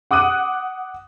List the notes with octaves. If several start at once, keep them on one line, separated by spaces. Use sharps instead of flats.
F#5 D6 D#6 F#6 D#7